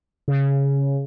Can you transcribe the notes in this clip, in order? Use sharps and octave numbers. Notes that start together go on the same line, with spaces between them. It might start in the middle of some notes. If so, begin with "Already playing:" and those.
C#3